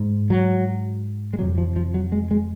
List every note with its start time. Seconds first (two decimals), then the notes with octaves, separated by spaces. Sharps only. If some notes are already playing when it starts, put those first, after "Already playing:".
Already playing: G#2
0.30 F#3
1.33 G#3
1.39 F2 C3 F#3
1.58 F3
1.76 F3
1.94 F#3
2.12 G#3
2.31 G#3